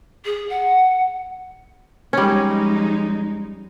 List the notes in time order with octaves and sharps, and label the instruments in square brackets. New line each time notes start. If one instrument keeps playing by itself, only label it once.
[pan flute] G#4
F#5
[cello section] F2 G#3 D#4 [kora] G3 C#4